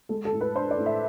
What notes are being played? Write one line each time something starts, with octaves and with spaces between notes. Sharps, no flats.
G#3 A4
A4
A2
B4
D4 C5
D5
A2
E5